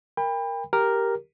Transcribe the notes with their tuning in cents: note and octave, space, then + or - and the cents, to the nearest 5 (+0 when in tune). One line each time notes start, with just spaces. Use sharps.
A#4 +0 G5 +35 B5 +0
G4 +0 A#4 +0